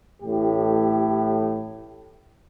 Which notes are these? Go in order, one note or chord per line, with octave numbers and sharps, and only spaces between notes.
A1 A2 G4